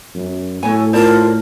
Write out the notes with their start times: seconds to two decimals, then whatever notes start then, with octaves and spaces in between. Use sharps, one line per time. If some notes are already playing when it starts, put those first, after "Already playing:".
0.15 F#2
0.63 A2 F#4 A4 C#5 G#5
0.93 F4 A#4 C5 D5 A5